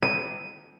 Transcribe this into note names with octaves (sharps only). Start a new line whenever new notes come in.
D#7